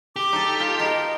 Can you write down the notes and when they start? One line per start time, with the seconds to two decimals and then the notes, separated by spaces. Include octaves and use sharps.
0.16 G4 D6
0.33 D#4 A4
0.60 F4
0.80 B3 A#4 D#5